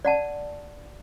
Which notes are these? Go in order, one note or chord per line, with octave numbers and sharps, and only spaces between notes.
D5 F#5 A5